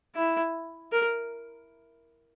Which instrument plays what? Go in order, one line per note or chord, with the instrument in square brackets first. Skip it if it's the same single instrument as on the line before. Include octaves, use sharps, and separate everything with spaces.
[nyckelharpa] E4
A#4